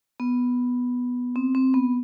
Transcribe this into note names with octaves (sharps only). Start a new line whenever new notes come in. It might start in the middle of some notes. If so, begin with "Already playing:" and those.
B3
C4
C4
B3